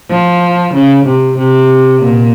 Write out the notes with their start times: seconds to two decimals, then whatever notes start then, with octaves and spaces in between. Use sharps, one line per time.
0.10 F3
0.74 C#3
1.05 C3
1.38 C3
2.02 A#2